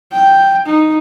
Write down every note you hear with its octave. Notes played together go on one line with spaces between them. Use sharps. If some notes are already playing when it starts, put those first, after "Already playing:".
G5
D#4